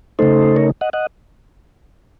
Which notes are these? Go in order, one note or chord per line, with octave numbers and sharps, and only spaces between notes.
C#3 A3 D#4 A4 C5
A#4 C#5
D#5 F#5
D#5 F#5